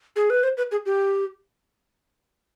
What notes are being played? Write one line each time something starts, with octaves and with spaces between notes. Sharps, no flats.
G#4
B4
C5
B4
G#4
G4